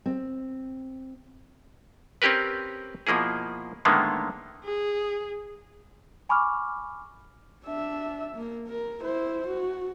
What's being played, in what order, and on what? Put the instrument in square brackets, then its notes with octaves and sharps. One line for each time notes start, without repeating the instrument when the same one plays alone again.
[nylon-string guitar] C4
[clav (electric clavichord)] C4 C#4 G4 A#4 B4
B2 F3 A#3 E4 G#4
A2 D3 D#3 G#3 A#3 B3
[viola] G#4
[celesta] G#5 B5 C#6 D6 F6
[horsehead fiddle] D4 E5
A#3
A#4
E4 C5
F#4